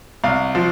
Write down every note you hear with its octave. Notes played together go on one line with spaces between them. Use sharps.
C2 F5
F3